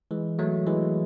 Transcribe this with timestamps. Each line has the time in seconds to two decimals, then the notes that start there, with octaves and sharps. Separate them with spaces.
0.11 E3 G#3
0.39 F#3 A3
0.67 E3 G#3